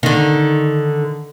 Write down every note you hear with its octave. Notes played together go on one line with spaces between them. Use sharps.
D3 D#3